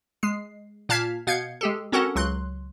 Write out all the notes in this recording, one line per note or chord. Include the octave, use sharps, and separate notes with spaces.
G#3 C7
A#2 F5 A5 F6 G#6 B6
B2 F5 G6 G#6 C#7
G#3 G4 A4
C4 C#4 F#4 A4 A#4 F#5
C#2 F#3 C6 F#6